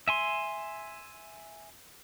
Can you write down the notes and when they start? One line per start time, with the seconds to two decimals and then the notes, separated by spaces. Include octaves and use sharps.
0.08 E5 G#5 C6